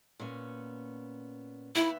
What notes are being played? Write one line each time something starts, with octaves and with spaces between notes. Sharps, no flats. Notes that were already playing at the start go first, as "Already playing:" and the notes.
A#2 B3 C#4
D#2 B3 E4 E5